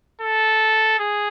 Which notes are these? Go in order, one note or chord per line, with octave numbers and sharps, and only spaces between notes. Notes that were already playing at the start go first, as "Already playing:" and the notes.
A4
G#4